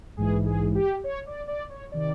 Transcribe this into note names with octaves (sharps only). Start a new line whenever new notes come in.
A#1 G#2 E3 G#4
G#4
G4
C#5
D5
D5
C#5
C3 D#3 D5